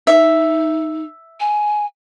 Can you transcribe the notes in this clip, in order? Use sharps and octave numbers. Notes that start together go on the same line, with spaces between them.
D#4 E5
G#5